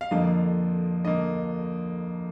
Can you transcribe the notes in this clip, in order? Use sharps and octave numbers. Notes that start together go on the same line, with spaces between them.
F5
F2 D3 F3 A#3 D#5
D3 F3 A#3 D#5